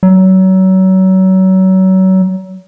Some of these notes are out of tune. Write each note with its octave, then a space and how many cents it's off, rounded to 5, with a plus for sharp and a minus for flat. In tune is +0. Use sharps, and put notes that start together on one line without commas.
F#3 +30